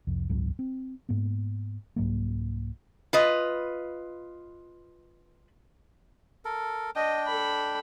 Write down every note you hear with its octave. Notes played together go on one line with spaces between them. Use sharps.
C2 F2
F#1 C#2 G#2 F#3
C4
G#2 A#3 B3
C2 G#2 F#3 A#3
F4 B4 D#5
A4 A#4
D4 D#5 G5
A4 B5